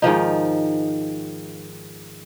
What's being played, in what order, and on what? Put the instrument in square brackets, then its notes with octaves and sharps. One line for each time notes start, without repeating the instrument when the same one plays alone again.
[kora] G#2 D#3 F3 D#4